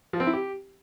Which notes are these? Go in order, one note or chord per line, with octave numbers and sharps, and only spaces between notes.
F3
C4
E4
G4